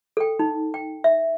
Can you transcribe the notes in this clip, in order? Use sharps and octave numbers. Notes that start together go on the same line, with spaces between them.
A4 G5
D#4
G5
E5